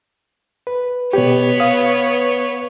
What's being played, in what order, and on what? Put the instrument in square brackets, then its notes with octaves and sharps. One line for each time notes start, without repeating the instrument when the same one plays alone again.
[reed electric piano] B4
[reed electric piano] B2 G4 [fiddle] B3 C#5
[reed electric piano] B4 F5 D#6